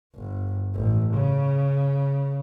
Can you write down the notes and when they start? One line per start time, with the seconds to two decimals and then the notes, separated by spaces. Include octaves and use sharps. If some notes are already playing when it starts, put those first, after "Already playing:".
0.15 G1
0.74 A1
1.14 C#3